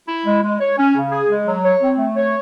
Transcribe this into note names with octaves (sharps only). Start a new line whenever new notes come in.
E4
G#3
G#3
C#5
C#4
C#3
G#4
G#3
F#3
C#5
C4
A3
C#5